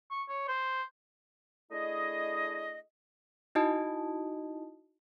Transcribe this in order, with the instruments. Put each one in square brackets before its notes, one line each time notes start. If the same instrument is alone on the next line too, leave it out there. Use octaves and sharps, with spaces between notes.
[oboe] C#6
C#5
C5
[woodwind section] A3 D4 E4 G#4 D#5
[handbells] D#4 E4 F#4 D#5 A5 D#6